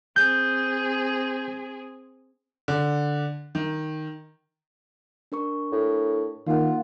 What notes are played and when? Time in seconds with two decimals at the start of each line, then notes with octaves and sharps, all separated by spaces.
0.16 C4 G#4 G6
2.68 D3
3.55 D#3
5.32 D4 A#4 C#6
5.72 A2
6.48 D#3 A#3 F4 F#5